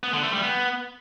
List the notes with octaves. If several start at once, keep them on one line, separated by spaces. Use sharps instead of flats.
B3
D3
A3
G3
B3